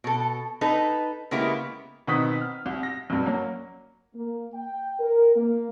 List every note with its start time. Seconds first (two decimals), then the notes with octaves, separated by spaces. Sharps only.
0.04 B2 A4
0.61 D#4 A4 B4
1.31 C#3 G#3 A#3 B3 E4 G4
2.07 B2 D#3 B3 C4 D#6 B6
2.41 F6
2.66 C2
2.83 A#6
3.10 B1 G2
3.25 F#3 A#3 C#4
4.15 A#3
4.55 G5
5.01 A#4
5.37 A#3